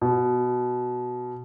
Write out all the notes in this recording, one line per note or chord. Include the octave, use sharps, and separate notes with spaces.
B2